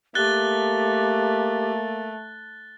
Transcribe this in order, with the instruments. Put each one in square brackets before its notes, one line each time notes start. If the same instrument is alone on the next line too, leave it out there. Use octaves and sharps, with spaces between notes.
[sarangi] A3 [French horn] A#3 [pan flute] G4 [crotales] F#6 A6 G7